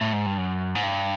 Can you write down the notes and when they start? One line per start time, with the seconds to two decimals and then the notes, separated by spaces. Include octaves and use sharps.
0.01 A2
0.13 G#2
0.26 G2
0.38 F#2
0.75 G#2
0.83 G2